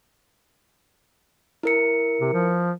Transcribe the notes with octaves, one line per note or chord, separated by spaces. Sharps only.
E4 A#4 C#7
C3
F3